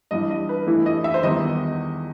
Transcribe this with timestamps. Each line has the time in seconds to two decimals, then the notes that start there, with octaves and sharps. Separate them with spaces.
0.11 G2 E3 G3 D#5
0.30 D#5
0.49 B4
0.67 G2 E3 A3 E4
0.86 D#5
1.04 E5
1.14 C5
1.23 E2 D#3 G3 B3 D#5